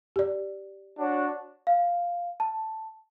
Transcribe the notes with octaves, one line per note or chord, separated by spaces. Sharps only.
G4 D5
D4 F#4 C#5
F5
A5